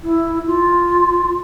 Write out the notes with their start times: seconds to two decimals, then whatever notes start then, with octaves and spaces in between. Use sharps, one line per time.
0.03 E4
0.47 F4